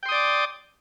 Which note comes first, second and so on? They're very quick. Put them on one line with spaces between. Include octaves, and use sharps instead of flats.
G5 C6 D#6 D5 D6